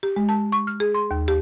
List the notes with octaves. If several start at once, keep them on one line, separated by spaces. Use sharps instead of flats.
G4
G#3
A5
C#6
F6
G#4
C6
D#2
G4